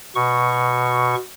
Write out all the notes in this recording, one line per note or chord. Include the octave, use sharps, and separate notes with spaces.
B2 C#6